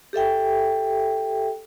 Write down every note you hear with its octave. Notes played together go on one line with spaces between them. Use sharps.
G4 A4 E5 G5